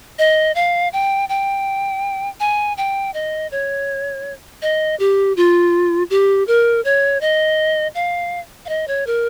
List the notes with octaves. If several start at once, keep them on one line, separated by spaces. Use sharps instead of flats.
D#5
F5
G5
G5
G#5
G5
D#5
C#5
D#5
G4
F4
G4
A#4
C#5
D#5
F5
F5
D#5
C#5
A#4